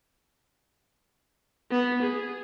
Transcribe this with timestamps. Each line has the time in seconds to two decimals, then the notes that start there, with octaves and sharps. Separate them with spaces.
1.71 B3
2.02 G#4